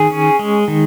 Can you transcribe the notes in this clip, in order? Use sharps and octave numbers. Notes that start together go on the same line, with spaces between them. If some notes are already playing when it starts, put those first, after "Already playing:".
Already playing: D#3 G#4
C#4
G#3
D#3